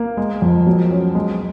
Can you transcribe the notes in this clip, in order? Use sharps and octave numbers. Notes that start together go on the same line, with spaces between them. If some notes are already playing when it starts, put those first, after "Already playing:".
Already playing: A#3
G#3
F2
F#3
C#4
G#3